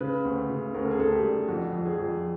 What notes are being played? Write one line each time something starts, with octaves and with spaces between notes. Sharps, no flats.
C#3 B4
D2
C#3
D2 A#4
A4
G#4
D2 A4
G4
G3
F2 F#4
F2
G#4
F2